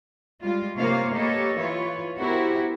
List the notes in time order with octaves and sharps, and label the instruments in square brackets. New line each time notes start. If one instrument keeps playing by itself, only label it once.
[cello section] G3 G#3 F4
C3 A#3 F4 C5 C#5 F5
A#3 G4 A4 B4 C#5 D#5
E3 F4 B4 C#5
B3 E4 F#4 G4 A#4 C5